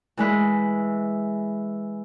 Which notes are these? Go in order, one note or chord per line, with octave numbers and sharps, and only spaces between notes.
E3 G#3 B4